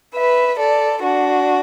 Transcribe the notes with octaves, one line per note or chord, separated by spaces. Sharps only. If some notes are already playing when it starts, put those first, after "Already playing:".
B4 E5
A4 D5
D4 F#4